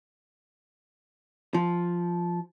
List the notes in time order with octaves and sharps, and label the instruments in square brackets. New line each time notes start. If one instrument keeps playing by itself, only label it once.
[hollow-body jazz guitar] F3